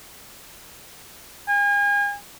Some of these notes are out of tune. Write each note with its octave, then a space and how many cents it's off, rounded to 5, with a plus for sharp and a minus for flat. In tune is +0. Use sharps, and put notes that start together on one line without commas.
G#5 -40